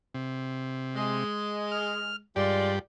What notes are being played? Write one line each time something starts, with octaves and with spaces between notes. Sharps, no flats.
C3
G#3
F6
G2 G#3 F4 G4 D5